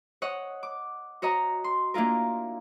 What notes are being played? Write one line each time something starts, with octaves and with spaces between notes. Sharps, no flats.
C#5 D#5 F#5
D6
F#4 C#5 D#5 A#5
C6
A#3 D4 E4 F4 A#4